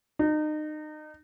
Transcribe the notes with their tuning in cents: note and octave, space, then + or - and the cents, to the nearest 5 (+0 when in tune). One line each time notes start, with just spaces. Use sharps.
D#4 -30